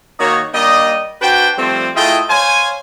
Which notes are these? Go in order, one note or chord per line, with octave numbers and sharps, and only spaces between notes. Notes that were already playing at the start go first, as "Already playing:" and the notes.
D#3 A#3 D#4 F#4 C#5
G3 A#3 D4 D#5
D4 F#4 B4 C5 G5
F3 G3 A3 C4 A4 C5
A3 E4 F4 G#4 D#5 G5
C5 C#5 F5 G#5